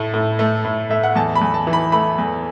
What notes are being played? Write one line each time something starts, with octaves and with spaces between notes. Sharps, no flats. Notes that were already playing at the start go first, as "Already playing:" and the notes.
Already playing: A2 A3
A2
A3
A2
A3 E5
F#5
E2 A5
B5
E2
A5
E3
B5
A3 B5
E2